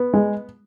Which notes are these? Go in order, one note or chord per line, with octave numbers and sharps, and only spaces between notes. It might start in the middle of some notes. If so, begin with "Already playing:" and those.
Already playing: B3
G#3